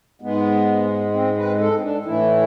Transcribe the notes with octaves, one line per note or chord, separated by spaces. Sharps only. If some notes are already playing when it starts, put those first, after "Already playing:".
G#2 G#3 B3
C4
B4
A4
C4
D4
A2 E3 A3 E4